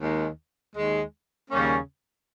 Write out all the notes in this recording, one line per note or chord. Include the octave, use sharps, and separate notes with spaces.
D#2 D#3 G#3
D#2 D#3 G#3
D#2 C#3 G3 A#3 C#4